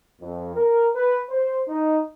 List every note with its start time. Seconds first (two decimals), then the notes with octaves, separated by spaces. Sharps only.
0.21 F2
0.56 A#4
0.96 B4
1.29 C5
1.68 D#4